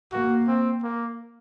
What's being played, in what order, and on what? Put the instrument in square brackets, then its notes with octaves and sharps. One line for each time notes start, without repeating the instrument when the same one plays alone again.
[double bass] A#3 [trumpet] F#4
[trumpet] C4
A#3